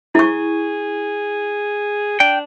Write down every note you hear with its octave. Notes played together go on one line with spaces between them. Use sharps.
E4 G#4 C#6
D4 G5